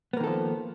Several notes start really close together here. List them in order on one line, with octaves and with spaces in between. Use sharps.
B3 A#3 D#3 A4 F3